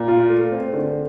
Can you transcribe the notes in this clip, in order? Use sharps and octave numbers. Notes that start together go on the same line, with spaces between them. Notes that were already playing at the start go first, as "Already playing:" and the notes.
Already playing: A#2
F4
A3
C4
D3